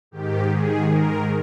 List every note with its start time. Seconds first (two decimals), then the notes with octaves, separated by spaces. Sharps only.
0.11 G#2 D#3 G4
0.49 G#4
0.86 A#4